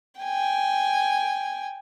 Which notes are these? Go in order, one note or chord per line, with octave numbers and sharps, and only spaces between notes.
G5 G#5